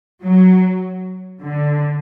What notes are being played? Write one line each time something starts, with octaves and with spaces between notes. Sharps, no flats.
F#3
D3